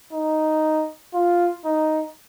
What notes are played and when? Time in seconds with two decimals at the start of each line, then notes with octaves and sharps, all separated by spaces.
0.13 D#4
1.14 F4
1.65 D#4